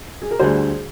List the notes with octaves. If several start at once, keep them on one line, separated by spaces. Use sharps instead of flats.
G#4
A#4
D2 D3 G3 G#4 C5